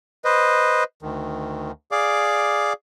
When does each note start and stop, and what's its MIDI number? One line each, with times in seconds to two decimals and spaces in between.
0.25 0.84 71
0.25 0.84 72
0.25 0.84 75
1.03 1.71 38
1.03 1.71 51
1.92 2.73 68
1.92 2.73 74
1.92 2.73 77
1.92 2.73 86